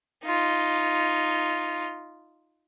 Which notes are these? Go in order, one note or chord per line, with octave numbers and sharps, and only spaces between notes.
D#4 F4